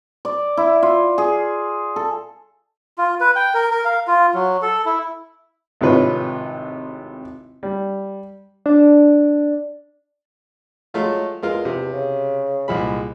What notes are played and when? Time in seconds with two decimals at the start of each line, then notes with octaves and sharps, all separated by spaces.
0.25 D5
0.57 E4
0.83 F4
1.18 G#4
1.96 A4
2.98 F4
3.21 B4
3.36 G5
3.55 A#4
3.71 A#4
3.85 F5
4.08 F4
4.34 F#3
4.62 A4
4.85 E4
5.81 G#1 A2 C3 F4 B4 C#5
7.63 G3
8.66 D4
10.94 F#3 G#3 A3 F4
11.43 E2 G#3 F4 A#4
11.65 C3
11.93 C#3
12.68 C2 A#2 G#3 B5